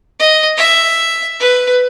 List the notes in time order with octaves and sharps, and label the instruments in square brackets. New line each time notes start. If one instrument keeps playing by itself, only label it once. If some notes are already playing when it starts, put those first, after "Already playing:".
[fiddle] D#5
E5
B4